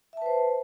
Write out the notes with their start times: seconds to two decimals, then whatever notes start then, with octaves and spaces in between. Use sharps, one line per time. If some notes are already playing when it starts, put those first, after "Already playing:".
0.13 E5
0.17 A5
0.22 B4
0.26 C5